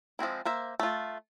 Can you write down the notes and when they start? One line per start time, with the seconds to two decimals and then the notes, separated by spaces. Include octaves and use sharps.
0.19 F3 G#3 C4 E4
0.45 A#3 C5 E5
0.80 A3 F4